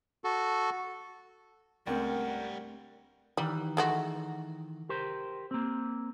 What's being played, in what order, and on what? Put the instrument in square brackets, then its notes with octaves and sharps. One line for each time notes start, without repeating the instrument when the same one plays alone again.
[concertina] F#4 A4
[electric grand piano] C#2 G5 [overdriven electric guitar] G3 F#5 [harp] A3 C4 D4 [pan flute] A#4
[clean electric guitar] D#3 E3 [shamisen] G3
[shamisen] G#3 A3 F#4
[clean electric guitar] G4 A#4 C5
A#3 C4